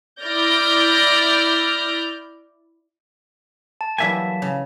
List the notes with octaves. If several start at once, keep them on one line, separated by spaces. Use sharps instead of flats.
E4 D5 F6 G6 A#6
A5
E3 F#3 G3 A#3 E5 G#5
C#3